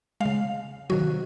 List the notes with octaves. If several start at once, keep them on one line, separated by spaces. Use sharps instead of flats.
C#3 G#3 F5
C3 D#3 F#3 F#4